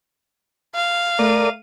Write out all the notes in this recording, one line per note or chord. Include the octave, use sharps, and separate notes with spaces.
F5
A3 A#4 D5 D#7